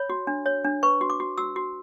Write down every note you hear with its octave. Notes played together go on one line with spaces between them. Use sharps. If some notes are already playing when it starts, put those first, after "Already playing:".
Already playing: C#5 B5
F#4
D4
C#5
D4
B4 C#6
F#4
D6
F#4
F#4 E6
F#4